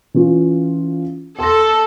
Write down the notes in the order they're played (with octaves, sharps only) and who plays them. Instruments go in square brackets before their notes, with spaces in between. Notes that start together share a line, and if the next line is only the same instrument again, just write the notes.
[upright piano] E3 C#4 F4
[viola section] A4 [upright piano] C6 A#6